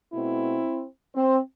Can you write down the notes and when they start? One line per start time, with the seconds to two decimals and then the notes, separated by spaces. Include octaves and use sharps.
0.13 B2 A3 C4 E4
1.15 C4